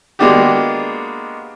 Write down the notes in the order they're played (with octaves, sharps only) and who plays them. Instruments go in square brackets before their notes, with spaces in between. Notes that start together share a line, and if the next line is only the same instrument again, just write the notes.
[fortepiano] G#3 A#3 B3 D4 F#4 G4